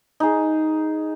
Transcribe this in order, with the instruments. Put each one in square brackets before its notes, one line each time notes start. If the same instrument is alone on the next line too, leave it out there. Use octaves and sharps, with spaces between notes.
[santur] D#4 G#4